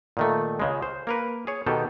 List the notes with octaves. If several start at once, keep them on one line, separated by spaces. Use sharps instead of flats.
A#2 D#3 A3
C#2 C#3 G#3
C5
A#3 A#4 B4
G#4 C#5
B2 D#3 G4 A4